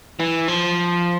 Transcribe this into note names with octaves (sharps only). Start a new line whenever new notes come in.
E3
F3